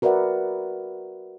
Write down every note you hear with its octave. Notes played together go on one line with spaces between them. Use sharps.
F#4 A#4 B4 D5 E5 F#5